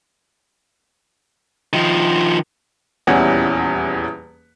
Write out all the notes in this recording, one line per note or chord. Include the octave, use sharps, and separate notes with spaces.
D#3 F3
D#1 E2 E3 G3 C#4 F#5